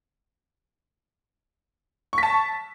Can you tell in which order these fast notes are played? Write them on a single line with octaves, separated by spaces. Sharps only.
C#6 B6 A5